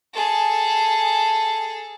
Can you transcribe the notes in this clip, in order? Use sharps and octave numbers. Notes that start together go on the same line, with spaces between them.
G#4 A4